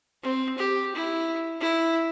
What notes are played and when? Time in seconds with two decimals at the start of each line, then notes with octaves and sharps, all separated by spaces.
0.22 C4
0.58 G4
0.95 E4
1.61 E4